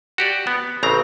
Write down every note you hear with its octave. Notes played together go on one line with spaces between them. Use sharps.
F#4 G4 D5
B3
A1 C#3 C4 A#5